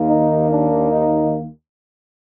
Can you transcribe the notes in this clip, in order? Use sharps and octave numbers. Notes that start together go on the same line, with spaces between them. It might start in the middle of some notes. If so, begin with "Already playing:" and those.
Already playing: D#2 D#3 A#3
D#4
D4
D#4